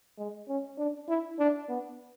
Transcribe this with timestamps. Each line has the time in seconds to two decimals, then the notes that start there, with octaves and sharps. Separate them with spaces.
0.18 G#3
0.48 C#4
0.78 D4
1.08 E4
1.39 D4
1.69 B3